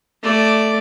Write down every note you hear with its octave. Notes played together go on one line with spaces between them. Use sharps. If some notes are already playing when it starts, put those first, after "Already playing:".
A3 D5